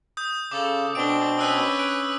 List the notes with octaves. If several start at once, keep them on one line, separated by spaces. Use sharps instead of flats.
D#6 G6
C#3 A4 D6
B2 C4 D4 D7 G7
C#4 B4 D#6 E6 F#6
F#6 D7